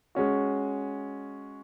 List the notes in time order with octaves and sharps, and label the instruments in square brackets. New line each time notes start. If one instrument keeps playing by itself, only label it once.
[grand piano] G#3 C#4 F#4